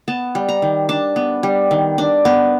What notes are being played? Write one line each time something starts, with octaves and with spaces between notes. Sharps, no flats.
B3 A5
G3
A#5
D#3
D4 A5
B3
G3
D#3
D4
B3